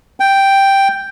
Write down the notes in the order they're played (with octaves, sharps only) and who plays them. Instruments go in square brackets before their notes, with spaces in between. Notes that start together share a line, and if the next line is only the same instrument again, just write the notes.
[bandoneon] G5